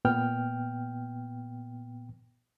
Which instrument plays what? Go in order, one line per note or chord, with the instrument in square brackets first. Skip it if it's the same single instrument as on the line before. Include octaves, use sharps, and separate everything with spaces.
[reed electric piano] A#2 B3 G5 F6